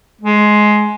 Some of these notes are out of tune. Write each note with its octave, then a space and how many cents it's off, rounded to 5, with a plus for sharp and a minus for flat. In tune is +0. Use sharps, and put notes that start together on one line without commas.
G#3 +15